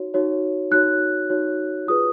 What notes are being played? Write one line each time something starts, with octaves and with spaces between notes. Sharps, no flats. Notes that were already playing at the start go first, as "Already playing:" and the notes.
Already playing: D#4 F#4 C#5
D#4 F#4 C#5
D#4 F#4 C#5 F#6
D#4 F#4 C#5
F4 G#4 B4 D#6